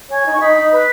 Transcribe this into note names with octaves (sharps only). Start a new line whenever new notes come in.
C#5 G#5
D#4
C#6
D#4 B5
D#4
B4 B5